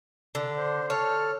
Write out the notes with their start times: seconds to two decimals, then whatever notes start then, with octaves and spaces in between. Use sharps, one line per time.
0.35 D3
0.57 C5
0.90 A4 C#5 F6